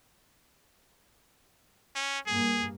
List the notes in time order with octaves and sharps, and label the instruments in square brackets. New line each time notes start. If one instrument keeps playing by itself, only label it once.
[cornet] C#4
[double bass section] G2 A#3 [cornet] G#4